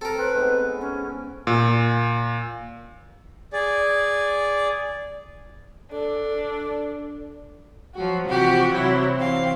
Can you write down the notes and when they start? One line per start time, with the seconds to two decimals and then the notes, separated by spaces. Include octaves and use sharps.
0.01 C4 A4 A#4
0.18 C4 B4
0.34 G#2 B3
0.81 C#4
1.47 A#2
3.53 G#4 D5
5.92 D4 A4
7.94 F3 F#3 F#4
8.25 C3 E3 F3 F#4 G4
8.72 C3 F#3 E4
9.15 E3 C4 F5